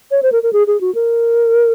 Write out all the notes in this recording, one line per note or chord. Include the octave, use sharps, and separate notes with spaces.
C#5
C5
A#4
A#4
G#4
G#4
F#4
A#4